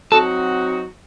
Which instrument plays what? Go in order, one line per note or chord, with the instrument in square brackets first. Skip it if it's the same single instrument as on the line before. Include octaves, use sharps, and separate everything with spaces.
[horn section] F#3 C4 D#4 F#4 [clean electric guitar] A4